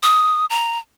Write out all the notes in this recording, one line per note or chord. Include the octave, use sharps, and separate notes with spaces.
D#6
A#5